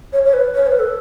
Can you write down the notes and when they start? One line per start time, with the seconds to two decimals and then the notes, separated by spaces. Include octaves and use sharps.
0.13 C#5
0.25 C#5
0.33 B4
0.55 C#5
0.67 B4
0.79 A4